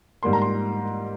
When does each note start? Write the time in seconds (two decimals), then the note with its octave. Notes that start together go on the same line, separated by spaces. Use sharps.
0.23 G#2 G3 A#3 C6
0.33 A#5
0.42 C6